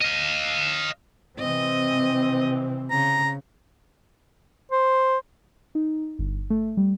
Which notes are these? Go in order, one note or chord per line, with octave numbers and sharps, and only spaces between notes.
D#5 F5
C3 E3 C4 D#5
C#3 A#5
C5
D#4
G1
A3
G3